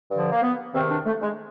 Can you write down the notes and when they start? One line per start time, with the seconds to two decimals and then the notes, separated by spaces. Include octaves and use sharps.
0.11 G2 D3 F3
0.32 A#3
0.43 B3
0.74 E2 C3 D#3 C4
0.90 D4
1.06 A3
1.22 G#3